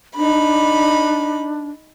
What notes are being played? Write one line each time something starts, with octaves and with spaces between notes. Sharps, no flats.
D4 D#4 B5